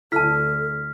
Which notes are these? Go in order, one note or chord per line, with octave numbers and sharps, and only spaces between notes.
D2 E4 A4 A5 F6 B6